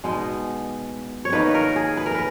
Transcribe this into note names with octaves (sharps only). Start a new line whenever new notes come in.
B2 G#3 B3 D#4
C#5
D#3 A#3 D#4 B4
A#4
G#4
B4
A#4
B4